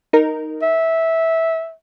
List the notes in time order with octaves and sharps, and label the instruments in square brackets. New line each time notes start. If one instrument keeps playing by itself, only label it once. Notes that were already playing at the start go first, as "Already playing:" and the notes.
[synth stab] D#4 A#4
[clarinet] E5